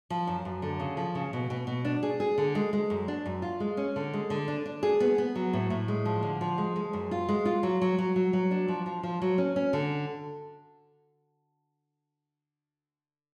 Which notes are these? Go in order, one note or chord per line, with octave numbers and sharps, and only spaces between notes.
F3
F#2
F#2
D3
C#3
F3
C#3
B2
B2
B2
D4
G#4
G#4
D3
G#3
G#3
F#2
D4
F#2
F4
G#3
C#4
D3
G#3
D3
D4
D4
G#4
B3
B3
F#3
A2
A2
G#3
F3
D3
F3
G#3
G#3
F#2
F4
G#3
F4
F#3
F#3
F#3
F#3
F#3
D4
F3
F3
F3
F#3
C#4
C#4
D3